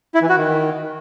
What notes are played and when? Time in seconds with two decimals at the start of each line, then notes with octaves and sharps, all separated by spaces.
0.15 E4
0.22 E3
0.29 F#4
0.37 D#3